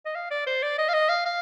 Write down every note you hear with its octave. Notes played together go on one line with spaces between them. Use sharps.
D#5
F5
D5
C5
D5
D#5
F5
D#5
F5
F5